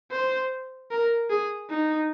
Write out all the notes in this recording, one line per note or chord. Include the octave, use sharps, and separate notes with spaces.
C5
A#4
G#4
D#4